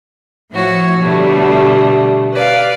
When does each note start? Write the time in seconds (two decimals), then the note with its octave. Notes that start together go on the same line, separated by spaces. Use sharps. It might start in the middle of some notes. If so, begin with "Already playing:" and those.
0.52 A2 F3 E4 F#4 C#5
1.00 B2 D3 G3 A3
2.33 B4 D5 F5